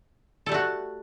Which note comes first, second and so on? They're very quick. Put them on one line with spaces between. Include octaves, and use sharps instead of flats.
A4 G3 A3 F#4